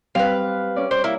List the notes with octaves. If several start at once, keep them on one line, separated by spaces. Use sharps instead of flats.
G3 C4 B4 F5
C#4 D5
C5 D5
A#3 E4